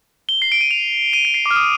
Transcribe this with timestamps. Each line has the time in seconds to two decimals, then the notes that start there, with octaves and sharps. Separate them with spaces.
0.29 G7
0.42 C7
0.52 D7
0.61 D#7
0.71 F7
1.13 D#7
1.25 D7
1.34 C7
1.46 D6
1.51 F6
1.56 D#6